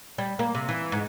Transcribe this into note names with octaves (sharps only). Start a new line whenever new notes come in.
G3
A#3
C3
E3
G#2